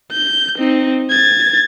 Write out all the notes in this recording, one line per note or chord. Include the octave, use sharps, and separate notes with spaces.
G6
C4 D#4
G#6 A6